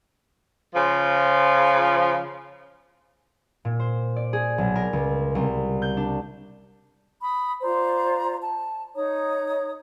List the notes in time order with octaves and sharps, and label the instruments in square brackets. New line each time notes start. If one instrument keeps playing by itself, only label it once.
[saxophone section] C#3 F3
[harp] A#2
C5
D5
G#4
B1
A#4
C#2
C2
G6
D4
[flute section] B5 D#6
F4 C5 D5 A#5
A5
D#4 C#5 A#5 D#6